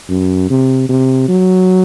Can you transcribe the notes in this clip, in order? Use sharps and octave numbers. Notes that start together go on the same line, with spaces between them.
F#2
C3
C3
F#3